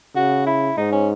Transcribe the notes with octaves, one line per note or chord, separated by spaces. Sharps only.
C#3 F#4
E4
G#2 D#4
C#4